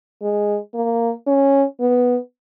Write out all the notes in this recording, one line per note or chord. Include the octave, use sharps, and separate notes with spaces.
G#3
A#3
C#4
B3